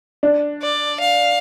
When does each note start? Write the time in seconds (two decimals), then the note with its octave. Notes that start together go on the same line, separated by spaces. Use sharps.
0.23 D4
0.62 D5
1.00 F5